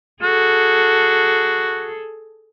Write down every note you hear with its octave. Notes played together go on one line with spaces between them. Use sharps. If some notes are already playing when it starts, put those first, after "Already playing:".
F#4 G#4 A4